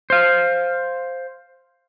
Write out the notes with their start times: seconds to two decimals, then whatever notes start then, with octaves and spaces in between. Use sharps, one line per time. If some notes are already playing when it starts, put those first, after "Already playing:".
0.10 C5 F5